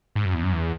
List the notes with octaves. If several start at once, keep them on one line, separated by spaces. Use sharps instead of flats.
G#2
F#2
E2
F#2
E2